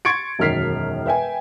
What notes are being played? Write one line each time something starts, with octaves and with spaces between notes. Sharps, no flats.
C6 C#6 G#6 A6 C#7 D7
E1 F#2 D#3 F6 B6 C7
B4 E5 G5 G#5